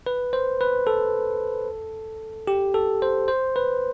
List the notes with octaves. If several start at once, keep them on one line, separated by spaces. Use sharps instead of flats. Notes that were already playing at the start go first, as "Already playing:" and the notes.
B4
C5
B4
A4
G4
A4
C5
C5
B4